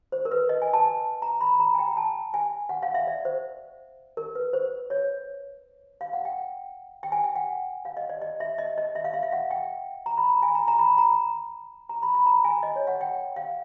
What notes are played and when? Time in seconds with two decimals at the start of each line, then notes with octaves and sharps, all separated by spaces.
0.12 C5
0.25 A#4
0.31 B4
0.49 D#5
0.62 G#5
0.74 A5
1.22 A#5
1.41 B5
1.60 A#5
1.74 G#5
1.79 G5
1.88 A#5
1.97 A5
2.34 G#5
2.69 F#5
2.83 F5
2.94 E5
3.07 D5
3.25 C5
4.17 A#4
4.35 B4
4.53 C5
4.90 C#5
6.01 F5
6.13 F#5
6.25 G5
7.03 G5
7.12 G#5
7.24 G5
7.36 F#5
7.85 F5
7.97 D#5
8.09 D5
8.22 D#5
8.40 E5
8.58 D#5
8.78 D#5
8.95 E5
9.04 F5
9.14 E5
9.23 F5
9.32 F#5
9.51 G5
10.06 A#5
10.18 B5
10.30 A#5
10.42 G#5
10.55 A#5
10.68 A#5
10.79 B5
10.98 A#5
11.89 A#5
12.03 B5
12.14 B5
12.26 A#5
12.44 G#5
12.63 D#5
12.76 C#5
12.87 F#5
13.01 G5
13.36 F5